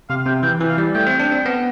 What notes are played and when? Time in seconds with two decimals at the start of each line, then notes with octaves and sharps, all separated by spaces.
0.10 C3 F5
0.26 C3 G5
0.43 E3 G5
0.60 E3
0.69 F5
0.78 G3
0.94 A3 G5
1.07 C4
1.20 D4
1.32 C4
1.46 B3